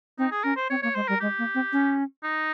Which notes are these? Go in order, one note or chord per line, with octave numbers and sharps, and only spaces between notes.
C4 D#4
G#4
C#4 A#4
C5
C4 C#5
A#3 C#5
G#3 C5
G3 A#4
G#3 G4
A#3
C4
C#4
D#4